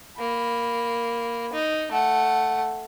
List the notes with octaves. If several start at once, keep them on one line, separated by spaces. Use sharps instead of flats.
A#3 B5
D#4
A3 F#5